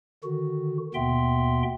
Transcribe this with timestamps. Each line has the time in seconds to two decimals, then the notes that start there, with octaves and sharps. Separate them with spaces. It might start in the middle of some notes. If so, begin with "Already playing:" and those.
0.24 D3 D#3 F#4
0.94 D#2 B2 B3 E5 G5 C6